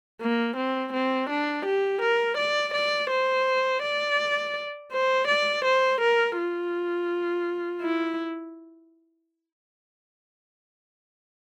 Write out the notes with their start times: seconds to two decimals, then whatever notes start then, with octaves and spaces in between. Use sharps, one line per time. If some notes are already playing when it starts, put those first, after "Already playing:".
0.21 A#3
0.57 C4
0.93 C4
1.30 D4
1.66 G4
2.02 A#4
2.38 D5
2.74 D5
3.10 C5
3.83 D5
4.93 C5
5.28 D5
5.65 C5
6.01 A#4
6.38 F4
7.82 E4